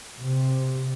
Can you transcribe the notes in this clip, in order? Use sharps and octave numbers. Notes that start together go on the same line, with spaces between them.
C3